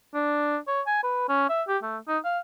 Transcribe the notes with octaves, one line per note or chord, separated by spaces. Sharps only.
D4
C#5
G#5
B4
C#4
E5
G4
A3
D#4
F5